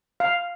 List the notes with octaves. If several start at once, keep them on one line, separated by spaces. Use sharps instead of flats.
F5